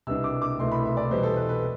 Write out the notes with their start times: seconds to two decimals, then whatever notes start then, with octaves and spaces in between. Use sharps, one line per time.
0.07 C2 B2 G3 B3 D4 E6
0.24 D6
0.42 D6
0.59 C2 B2 A3 E4 C6
0.72 B5
0.85 E5
0.97 D5
1.10 E2 B2 G3 B3 C5
1.23 A4
1.36 B4
1.49 B4